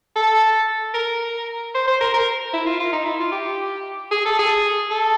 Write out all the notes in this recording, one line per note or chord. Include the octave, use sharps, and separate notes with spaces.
A4
A#4
C5
C5
A#4
A#4
E4
F4
F4
D#4
E4
F4
G4
G#4
A4
G#4
A4